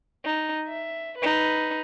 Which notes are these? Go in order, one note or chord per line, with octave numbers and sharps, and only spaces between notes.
D#4
E5
D#4 B4